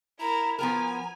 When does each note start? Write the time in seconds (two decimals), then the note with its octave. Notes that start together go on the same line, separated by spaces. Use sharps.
0.20 E4 A#4 A#5
0.59 F3 B3 A#4 G#5 A#5